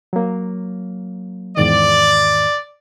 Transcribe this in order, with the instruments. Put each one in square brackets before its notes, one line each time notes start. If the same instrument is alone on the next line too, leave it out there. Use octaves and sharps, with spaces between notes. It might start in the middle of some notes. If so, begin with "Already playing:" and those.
[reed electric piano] F#3 A#3
[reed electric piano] E2 G#2 D#3 [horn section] D5